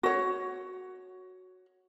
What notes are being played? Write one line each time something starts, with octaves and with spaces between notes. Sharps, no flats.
F#4 C#5